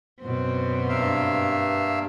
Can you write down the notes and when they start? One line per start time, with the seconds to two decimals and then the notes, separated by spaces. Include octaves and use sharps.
0.23 F#2 B2 C4
0.89 G2 A#3 E5 F5